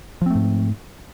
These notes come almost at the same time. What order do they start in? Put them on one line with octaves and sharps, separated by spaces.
F3 C4 A3 G#2